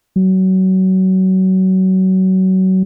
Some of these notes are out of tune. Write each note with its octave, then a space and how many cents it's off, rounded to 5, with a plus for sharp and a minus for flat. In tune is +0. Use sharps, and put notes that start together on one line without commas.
F#3 +25